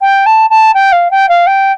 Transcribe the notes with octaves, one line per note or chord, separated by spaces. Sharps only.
G5
A5
A5
G5
F5
G5
F5
G5